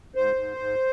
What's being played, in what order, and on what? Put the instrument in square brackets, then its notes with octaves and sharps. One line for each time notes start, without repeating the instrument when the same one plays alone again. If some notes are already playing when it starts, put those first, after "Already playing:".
[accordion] G#2 C5
G#2
G#2